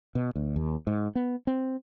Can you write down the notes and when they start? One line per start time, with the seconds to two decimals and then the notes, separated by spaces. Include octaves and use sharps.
0.15 B2
0.35 D2
0.56 D#2
0.87 G#2
1.15 B3
1.47 C4